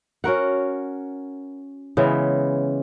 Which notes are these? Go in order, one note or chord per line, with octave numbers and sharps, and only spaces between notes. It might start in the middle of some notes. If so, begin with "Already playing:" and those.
C#4 F#4 A#4 F#5
C#3 E3 G#3 B3